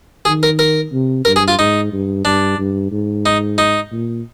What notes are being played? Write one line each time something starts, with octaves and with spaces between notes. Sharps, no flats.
D#3 G#4
A#4
A#4
C3
G2 A#4
G#4
F4
G#2 D#4
G2
G2 D4
G2
G#2
D#4
D#4
A#2